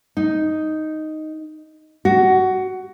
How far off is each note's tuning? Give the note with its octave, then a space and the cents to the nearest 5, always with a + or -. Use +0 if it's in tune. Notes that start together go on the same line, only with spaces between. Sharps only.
D#4 +0
F#4 +15